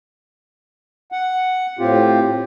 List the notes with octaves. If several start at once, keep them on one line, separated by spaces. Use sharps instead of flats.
F#5
A2 C4 F4 G4